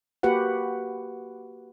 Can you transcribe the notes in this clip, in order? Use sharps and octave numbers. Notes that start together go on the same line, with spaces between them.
A#3 F#4 G4 B4 F#5